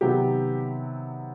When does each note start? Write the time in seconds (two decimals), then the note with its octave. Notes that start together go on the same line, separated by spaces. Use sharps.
0.01 C3 D#3 F#3 B3 G4